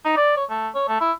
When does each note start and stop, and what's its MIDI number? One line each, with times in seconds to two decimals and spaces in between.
0.05 0.14 63
0.17 0.35 74
0.37 0.44 73
0.49 0.68 57
0.75 0.87 73
0.88 0.98 57
1.00 1.12 64